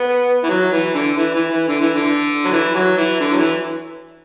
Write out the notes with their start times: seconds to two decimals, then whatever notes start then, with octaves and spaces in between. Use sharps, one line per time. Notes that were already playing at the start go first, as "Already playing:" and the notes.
Already playing: B3
0.44 E3
0.49 F#3
0.72 E3
0.94 D3
1.17 E3
1.34 E3
1.51 E3
1.68 D3
1.81 E3
1.94 D3
2.44 F#3
2.52 E3
2.75 F#3
2.97 E3
3.20 D3
3.33 F#3
3.37 E3